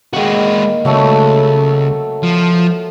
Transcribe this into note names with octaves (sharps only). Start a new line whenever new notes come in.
D#3 G#3 A#3 F#4
C#2 F#3 A3 A4
F3